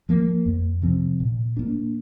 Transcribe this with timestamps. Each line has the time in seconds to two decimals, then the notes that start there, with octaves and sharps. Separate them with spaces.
0.09 F3 A#3
0.46 F2
0.82 C3 F3 C4
1.20 A#2
1.57 A#3 D4